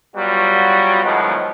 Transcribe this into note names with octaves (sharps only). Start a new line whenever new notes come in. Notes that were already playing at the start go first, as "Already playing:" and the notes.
F#3 G3 B3 F4 F#4
A2 D#3 F3 F#3 G#3 B3